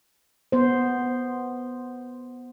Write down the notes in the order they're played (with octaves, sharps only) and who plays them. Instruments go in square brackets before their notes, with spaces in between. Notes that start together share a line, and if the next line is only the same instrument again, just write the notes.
[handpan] B3 C5